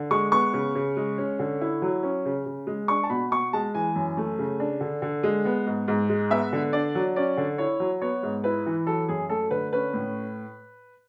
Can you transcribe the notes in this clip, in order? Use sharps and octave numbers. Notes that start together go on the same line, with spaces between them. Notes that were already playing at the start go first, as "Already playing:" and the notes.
Already playing: D3
G#3 C#6
B3 C#6
C#3
C#3
G#3
C#4
D3
E4
F#3
C#4
C#3
C#3
G#3
D4 C#6
A5
B2 B5
B2 C#6
G#3 A5
E3 G#5
F#2
A3
C#3
D4
D3
D3
G#3
B3
G#2
G#2
G#3
B3 E5
D3
D4 D5
F#3
C#4 D5
D3
E4 C#5
F#3
B3 C#5
G#2
E4 B4
E3
F#3 A4
F#2 G#4
A3 A4
D3 B4
C#4 B4
A2